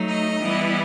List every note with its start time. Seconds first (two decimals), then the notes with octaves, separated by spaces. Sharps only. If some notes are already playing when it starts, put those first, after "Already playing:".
Already playing: F#3 A3 D#4
0.08 D#5
0.41 E3 G3 B3 E4